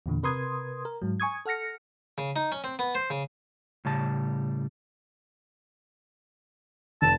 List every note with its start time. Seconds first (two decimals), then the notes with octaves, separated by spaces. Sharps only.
0.06 E2 A#2 D3
0.23 C3 A#4 B4 C6 D#6 G#6
0.85 A#4
1.02 G#2 F#3
1.20 G#5 C#6 D#6 G#6
1.45 A4 F#5 F6 A#6 C#7
2.18 C#3
2.36 D#4
2.52 C#4
2.64 C4
2.79 B3
2.95 C5
3.10 C#3
3.85 A2 C#3 G3 A5
7.02 F1 A5